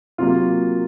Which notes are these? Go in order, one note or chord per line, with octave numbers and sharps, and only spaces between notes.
C3 F#3 A#3 F4